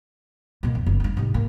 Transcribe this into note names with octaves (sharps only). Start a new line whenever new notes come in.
B2 A#3
F2
F#1
G3 D4
G#2 C3
A#3